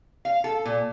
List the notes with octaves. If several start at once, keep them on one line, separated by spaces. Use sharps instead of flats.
F5
A4
A#2